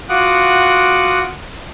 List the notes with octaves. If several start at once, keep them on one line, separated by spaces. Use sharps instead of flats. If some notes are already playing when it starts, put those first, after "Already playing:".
F4 F#4 F#5 D6 D#6 F#6